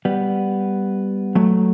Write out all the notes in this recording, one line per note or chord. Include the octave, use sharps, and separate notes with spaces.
G3 B3
F#3 A3